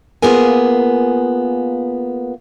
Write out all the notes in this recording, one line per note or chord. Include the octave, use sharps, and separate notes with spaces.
A#3 B3 F4 G#4 A#4 G#5